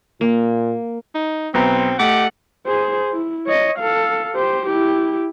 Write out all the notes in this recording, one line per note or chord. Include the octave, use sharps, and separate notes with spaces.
A#2 A#3
D#4
B1 B3 C4 A#5
A3 G4 D#5 F#5 D6
G#4 C5
E4
C#5 D#5
A4 F5
G4 C5
E4 G4